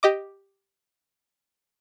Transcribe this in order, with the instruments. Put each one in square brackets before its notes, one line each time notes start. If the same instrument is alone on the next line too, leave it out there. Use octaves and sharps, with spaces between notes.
[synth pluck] G4 D#5 D6